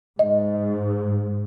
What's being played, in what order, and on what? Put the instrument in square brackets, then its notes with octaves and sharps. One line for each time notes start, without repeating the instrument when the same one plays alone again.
[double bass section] G#2 [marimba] D#5